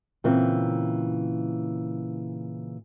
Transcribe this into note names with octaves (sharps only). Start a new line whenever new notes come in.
A#2 C#3 E3 C4